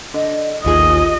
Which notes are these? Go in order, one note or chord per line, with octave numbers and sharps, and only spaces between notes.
D3 D#5
A1 D#2 F4 G#4 D#5